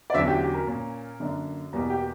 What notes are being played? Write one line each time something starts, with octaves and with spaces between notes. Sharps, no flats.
D5
E2 D3 F#3 C#4 E5
G4
G4
A#4
A#2 A#3 C#4
F#2 D3 A#3 D4
E2 B2 G3 A#3
G4